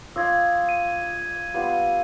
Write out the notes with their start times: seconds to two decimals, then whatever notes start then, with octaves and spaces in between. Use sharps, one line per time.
0.16 F4 D5 D#5 E6 G#6
0.69 D#7
1.54 G3 B3 F4